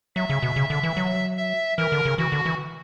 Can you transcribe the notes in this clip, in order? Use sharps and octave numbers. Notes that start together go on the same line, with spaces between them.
F#3 E5
C#3
B2
C#3
D3
E3
F#3
E5
E3 A#4
D3
C#3
E3 F#4
D3
E3